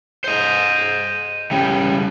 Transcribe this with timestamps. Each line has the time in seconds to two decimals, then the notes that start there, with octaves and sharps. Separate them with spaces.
0.24 C5 D#5
1.51 C#3 G3